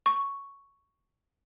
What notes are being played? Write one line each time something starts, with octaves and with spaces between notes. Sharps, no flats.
C#6